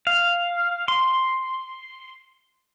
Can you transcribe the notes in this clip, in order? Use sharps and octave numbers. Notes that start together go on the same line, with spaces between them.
F5
C6